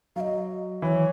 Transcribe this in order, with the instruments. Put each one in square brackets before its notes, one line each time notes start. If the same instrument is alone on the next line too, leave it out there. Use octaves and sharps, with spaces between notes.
[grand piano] F#3 [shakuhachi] F5
[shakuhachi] D#5
[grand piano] E3 [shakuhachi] C#5